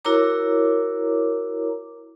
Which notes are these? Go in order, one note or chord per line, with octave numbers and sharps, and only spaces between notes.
E4 F#4 A#4 C#5 A#5 D6